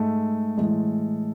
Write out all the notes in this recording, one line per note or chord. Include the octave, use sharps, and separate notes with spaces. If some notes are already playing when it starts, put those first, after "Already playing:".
Already playing: G#2 G#3 A3
A2 E3 G#3